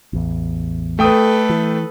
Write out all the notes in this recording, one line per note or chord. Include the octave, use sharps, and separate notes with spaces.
A1 E2
A3 A4 B4 G5 D#6
E3